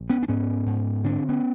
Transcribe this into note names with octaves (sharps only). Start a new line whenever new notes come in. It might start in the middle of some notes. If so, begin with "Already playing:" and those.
Already playing: A#1
B3 C#4
D4
G#2 B3 C#4
G#2
D3 C4 D4
B3 C#4